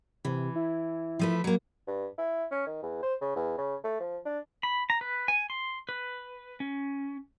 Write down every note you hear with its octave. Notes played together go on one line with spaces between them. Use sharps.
C3 E3
E4
F3 A3 B4
F#3 A#3
G2
E4
C#4
D#3
E2
C5
C#3
E2
C#3
A3
F3
D4
B5
A#5
B4
G#5
C6
B4
C#4